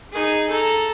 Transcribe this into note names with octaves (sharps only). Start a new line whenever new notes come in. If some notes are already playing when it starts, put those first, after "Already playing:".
D#4 G#4
A4 A#5